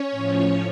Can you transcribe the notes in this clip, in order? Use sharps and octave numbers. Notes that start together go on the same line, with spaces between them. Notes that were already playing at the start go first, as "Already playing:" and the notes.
Already playing: C#4 C#5
A2 F3